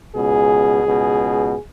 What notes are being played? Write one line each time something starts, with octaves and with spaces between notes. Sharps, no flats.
C#2 B2 G#4
C#2 B2